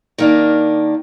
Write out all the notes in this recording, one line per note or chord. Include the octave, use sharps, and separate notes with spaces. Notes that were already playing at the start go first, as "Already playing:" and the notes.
D#3 A#3 D4